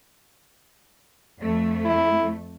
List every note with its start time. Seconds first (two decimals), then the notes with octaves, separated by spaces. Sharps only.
1.42 F2 A3
1.85 E4